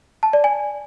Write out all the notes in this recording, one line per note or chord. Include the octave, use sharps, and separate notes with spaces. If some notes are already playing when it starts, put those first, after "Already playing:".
A5
D5
G#5